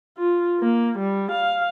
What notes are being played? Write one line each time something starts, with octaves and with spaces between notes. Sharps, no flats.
F4
A#3
G3
F5